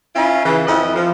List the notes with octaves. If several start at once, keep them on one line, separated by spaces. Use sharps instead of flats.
C#4 E4 F4
C#3 E3
F2 E4 D#5
F3